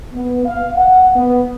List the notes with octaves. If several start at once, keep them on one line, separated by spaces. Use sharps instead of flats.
B3
F5
F#5
B3